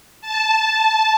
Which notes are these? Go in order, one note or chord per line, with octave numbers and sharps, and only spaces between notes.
A5